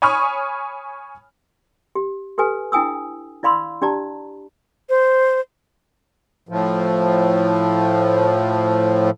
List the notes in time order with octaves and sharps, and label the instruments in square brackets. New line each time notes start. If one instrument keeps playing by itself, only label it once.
[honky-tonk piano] C#5 G#5 B5 C#6 D#6 F6
[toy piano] G4
G4 A4 B4 G#5
D4 E4 G5 G#5 D#6 E6
E4 D5 F5 B5 C6 E6
D4 G4 D5 A5 A#5
[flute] C5
[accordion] A2 F3